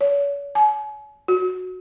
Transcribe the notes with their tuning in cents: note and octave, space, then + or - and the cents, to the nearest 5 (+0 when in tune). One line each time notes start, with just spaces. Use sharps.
C#5 +40
G#5 +40
F#4 -10